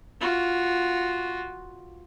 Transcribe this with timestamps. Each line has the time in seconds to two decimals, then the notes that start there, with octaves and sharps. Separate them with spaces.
0.21 F4 F#4